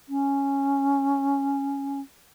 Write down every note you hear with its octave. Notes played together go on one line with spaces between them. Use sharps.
C#4